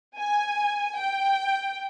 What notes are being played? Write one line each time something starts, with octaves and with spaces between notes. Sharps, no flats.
G#5
G5